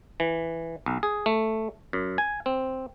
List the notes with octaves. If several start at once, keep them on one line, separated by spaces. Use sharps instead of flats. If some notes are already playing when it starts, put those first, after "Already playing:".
E3
B1
G#4
A3
F#2
G#5
C4